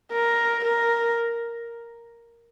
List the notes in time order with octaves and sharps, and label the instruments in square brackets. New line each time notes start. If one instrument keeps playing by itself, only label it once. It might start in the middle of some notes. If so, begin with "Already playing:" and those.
[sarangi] A#4
A#4